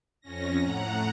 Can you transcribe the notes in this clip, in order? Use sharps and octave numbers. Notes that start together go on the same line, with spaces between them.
F2 C#4 A#6
A2 F#5 A#5